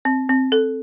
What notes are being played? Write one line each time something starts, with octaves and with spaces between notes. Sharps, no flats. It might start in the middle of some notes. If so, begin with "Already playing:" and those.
C4
C4
A4